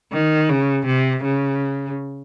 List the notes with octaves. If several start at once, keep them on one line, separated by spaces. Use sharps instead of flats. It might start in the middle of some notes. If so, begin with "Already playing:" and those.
D#3
C#3
C3
C#3